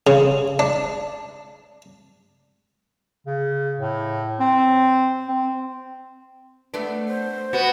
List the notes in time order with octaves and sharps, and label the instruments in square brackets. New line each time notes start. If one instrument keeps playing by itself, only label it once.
[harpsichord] C#3
D4
[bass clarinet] C#3
A2
C4
C4
[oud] A3 B3 D4
[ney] C5
[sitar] B3 F#4